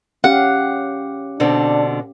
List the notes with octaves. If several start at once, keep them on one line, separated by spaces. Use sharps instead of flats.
C#4 G4 F5 F#5
B2 D3 C4 D4